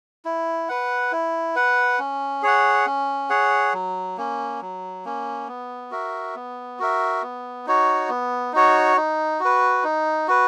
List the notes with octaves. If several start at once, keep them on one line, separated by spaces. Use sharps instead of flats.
E4
B4 F#5
E4
B4 F#5
C#4
G#4 C#5 F#5
C#4
G#4 C#5 F#5
F#3
A#3 C#4
F#3
A#3 C#4
B3
F#4 A#4 E5
B3
F#4 A#4 E5
B3
D#4 F#4 C#5
B3
D#4 F#4 C#5
D#4
F#4
B4
D#4
F#4 B4